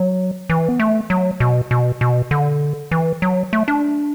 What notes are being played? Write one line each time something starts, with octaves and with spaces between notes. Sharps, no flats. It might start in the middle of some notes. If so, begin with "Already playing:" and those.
Already playing: F#3
E3
B3
A3
F#3
B2
B2
B2
D3
E3
F#3
A3
D4